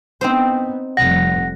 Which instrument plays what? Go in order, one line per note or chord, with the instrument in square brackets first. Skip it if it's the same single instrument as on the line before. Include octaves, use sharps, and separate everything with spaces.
[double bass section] B3 [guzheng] C4 D#4 C5
[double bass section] F1 G3 [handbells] F#5 A#6